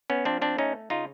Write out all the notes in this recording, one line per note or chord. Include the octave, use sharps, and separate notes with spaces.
B3 C#4
F3 C4 D4
C4 D4
A3 C#4 D#4
C#3 D#4 F4